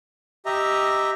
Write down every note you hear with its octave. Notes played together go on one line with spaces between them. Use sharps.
G4 D#5 E5 A#5